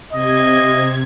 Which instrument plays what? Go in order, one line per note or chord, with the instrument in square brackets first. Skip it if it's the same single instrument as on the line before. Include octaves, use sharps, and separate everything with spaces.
[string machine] C3 G#6 [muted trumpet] D#5